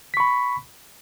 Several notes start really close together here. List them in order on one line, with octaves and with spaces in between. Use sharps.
B6 C#6 B5